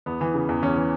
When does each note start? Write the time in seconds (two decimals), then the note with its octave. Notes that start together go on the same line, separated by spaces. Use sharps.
0.06 E2 B3
0.21 E3
0.34 C#3
0.49 E2
0.63 E2 C#4
0.76 E3